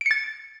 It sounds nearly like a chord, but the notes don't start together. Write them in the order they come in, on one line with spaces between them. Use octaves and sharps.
D7 C#7 A6